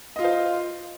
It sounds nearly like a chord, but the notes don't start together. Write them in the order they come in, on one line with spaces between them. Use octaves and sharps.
D#5 F4 F5 C5